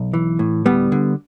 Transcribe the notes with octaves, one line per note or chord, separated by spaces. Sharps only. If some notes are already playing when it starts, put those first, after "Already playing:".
Already playing: B1
E3
A2
D2 G3 B3
D3